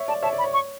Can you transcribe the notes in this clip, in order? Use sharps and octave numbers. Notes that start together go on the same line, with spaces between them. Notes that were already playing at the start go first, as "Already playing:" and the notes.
Already playing: C#5 E5
D5 A5
C#5 E5 A5
D5
B5
C#5
C#6